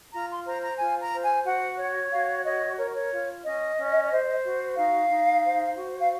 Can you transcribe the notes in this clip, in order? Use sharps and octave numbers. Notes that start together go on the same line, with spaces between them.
F4 A#5
C6
C5 A#5
A#5
F4 G#5
A#5
C5
G#5
F#4 F#5
C#5
F#4 F5
C#5 D#5
A#4 C#5
C#5
F4
C#4 D#5
C#4
C5
F#4
D#4 F5
D#4
C5
F#4
F5